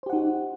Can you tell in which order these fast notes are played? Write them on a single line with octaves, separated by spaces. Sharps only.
C5 G4 F#5 D#4 F#4